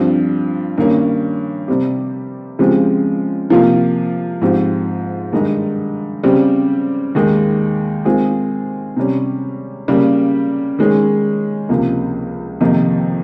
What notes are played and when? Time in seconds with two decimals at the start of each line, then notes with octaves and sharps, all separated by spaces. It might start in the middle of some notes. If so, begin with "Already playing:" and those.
Already playing: G2 F3 C4
0.78 G2 D#3 A#3 C#4
1.68 C3 G3 C4 G4
2.59 C#3 F3 G#3 C4 G4
3.50 C3 F3 A#3 F4
4.41 G#2 F3 C4 G4
5.33 G2 D#3 G#3 D#4
6.23 C#3 G3 C4 G4
7.15 D#2 D#3 G#3
8.05 D#3 G#3 C4 F4 G#4
8.97 C3 G3 C#4
9.88 C#3 G3 A#3
10.79 D#3 G#3 C#4 G#4
11.69 C#2 C3 F3 A#3
12.61 F2 C3 D#3 A#3 D#4